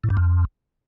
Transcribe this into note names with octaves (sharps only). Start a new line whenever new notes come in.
A2
G2
F2